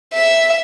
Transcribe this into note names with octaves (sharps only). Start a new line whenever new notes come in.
E5